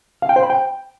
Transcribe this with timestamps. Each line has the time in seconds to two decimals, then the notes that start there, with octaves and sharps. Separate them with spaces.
0.22 F5
0.29 G5
0.36 C5
0.43 B5
0.50 G5